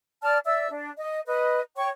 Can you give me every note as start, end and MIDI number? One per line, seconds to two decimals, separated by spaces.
0.22 0.38 74
0.22 0.38 81
0.22 0.38 89
0.44 0.68 74
0.44 0.68 76
0.44 0.68 88
0.70 0.90 62
0.98 1.20 75
1.25 1.60 71
1.25 1.60 75
1.76 1.89 73
1.76 1.89 79
1.76 1.89 85